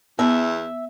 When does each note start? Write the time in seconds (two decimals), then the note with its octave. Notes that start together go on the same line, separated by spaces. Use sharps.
0.19 E2 B3 E5